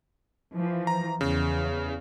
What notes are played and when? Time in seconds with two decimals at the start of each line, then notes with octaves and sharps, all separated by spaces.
0.55 E3 F3
0.87 A#5
1.21 E2 C#3